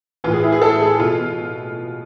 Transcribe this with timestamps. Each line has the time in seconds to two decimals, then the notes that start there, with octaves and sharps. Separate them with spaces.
0.24 E3 F4
0.27 A2
0.34 G#4
0.43 E4
0.52 G#4
0.62 A4
0.81 G#4
1.00 B2 F4